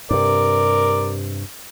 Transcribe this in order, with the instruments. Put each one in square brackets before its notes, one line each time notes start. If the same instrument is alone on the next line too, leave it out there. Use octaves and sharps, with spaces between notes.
[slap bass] G2 C3 [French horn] A#4 [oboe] D5